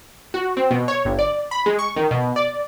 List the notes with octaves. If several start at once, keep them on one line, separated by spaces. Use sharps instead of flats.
F#4
C4
B2
C#5
G1
D5
B5
G#3
C#6
D#3
B2
D5